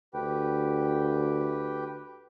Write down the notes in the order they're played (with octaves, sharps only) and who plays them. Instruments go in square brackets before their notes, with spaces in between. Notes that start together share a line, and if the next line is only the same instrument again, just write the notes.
[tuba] D2 [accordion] G4 B4 G5